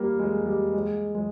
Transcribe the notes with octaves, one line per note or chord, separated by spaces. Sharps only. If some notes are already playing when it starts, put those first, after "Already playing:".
Already playing: G3 A#3
G#3
G3
G#3
G#3